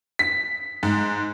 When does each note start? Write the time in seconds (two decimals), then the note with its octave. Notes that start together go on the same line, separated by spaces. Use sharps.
0.19 B6
0.83 G#2